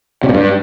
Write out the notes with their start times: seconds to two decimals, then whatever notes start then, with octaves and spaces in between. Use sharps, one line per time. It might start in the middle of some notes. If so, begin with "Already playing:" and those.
0.24 C3
0.29 B2
0.34 G2